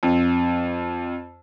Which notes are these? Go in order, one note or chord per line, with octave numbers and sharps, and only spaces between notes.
F2